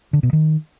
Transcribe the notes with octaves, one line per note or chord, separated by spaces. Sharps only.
D3
B2
D#3